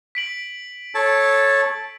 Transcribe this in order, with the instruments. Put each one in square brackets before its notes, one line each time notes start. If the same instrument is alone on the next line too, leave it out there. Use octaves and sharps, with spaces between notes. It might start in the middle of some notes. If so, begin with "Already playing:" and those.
[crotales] B6 D7 F#7
[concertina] A4 C#5 A5